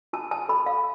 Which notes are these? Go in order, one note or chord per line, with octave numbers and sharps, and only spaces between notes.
F4 A5
A5
A4 B5
F5